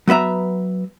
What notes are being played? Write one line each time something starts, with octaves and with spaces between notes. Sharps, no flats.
F#3 B3 B4 E5 A#5